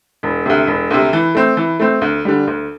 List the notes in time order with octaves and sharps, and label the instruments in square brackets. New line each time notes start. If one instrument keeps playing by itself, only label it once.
[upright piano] E1
D2 C3
E1
D2 C3
E3
A3 C4
E3
A3 C4
D2
D3 G3
D2